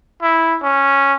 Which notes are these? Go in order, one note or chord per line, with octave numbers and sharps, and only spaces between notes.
E4
C#4